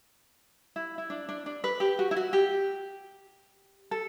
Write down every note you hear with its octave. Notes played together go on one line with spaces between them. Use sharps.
E4
E4
D4
D4
D4
B4
G4
F#4
E4
F#4
G4
A4